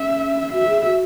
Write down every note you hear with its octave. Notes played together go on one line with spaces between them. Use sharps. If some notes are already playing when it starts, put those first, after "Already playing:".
Already playing: C#4 E5
F#4 E5
G#4
F#4